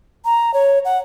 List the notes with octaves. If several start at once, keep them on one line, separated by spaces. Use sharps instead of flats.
A#5
C#5
F#5